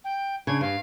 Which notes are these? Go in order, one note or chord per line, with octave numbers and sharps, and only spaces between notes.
G5
C#3 D4 G#6
G2 F5